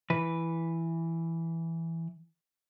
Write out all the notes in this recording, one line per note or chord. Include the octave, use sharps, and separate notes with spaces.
E3 B4